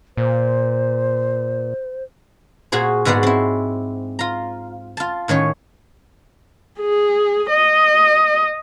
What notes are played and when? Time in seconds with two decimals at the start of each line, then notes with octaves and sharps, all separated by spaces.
0.17 A#2 C5
2.72 A#2 F#4 G#4 C5
3.05 G#2 G#3 B3 F#4 D5 F#5
3.23 C4 E4
4.19 F4 A#5
4.97 F4 A5
5.28 A2 D#3 C#4 C#5
6.80 G#4
7.50 D#5